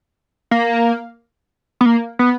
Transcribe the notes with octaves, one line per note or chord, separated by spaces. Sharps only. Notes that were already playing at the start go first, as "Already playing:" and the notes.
A#3
B3
A#3
B3